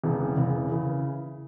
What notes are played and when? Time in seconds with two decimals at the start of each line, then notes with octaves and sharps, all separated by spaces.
0.03 E1 E2 C#3 E3
0.37 E1 E2 C#3 E3
0.72 C#3 E3